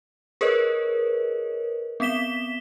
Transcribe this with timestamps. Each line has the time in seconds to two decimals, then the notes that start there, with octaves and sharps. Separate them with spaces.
0.41 G#4 A#4 B4 C#5 D#5
2.00 B3 C4 B6 E7 G7